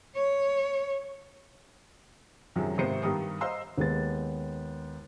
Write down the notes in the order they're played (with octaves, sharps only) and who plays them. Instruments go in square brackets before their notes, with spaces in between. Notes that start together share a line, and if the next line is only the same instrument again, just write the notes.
[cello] C#5
[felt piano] F#2 C3 D#3 F3 F#3 G#3
G#1 C3 D#3 B3 C5 C#7
G2 D#3 B3 G4 A#5 D#6
C5 D#5 F5 A#5 C6 E6
D#2 G#3 B3 A6